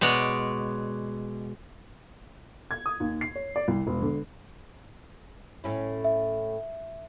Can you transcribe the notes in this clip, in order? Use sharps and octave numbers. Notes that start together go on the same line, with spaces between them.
B2 G#3 C#5 D5
G#6
D#6
D#2
C7
C#5
D5
C2
E1
D3
A2 C#4 E4
E5